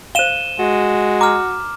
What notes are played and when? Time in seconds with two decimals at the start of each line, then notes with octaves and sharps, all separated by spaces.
0.15 C5 F5 D#7 E7 G7
0.59 G#3 F#4
1.21 A#5 D6 F6